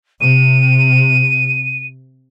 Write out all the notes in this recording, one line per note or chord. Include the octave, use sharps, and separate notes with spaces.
C3 D#7